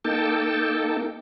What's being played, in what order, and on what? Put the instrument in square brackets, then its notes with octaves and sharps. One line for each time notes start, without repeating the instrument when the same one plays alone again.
[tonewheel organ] A#3 D#4 A4 G5 A5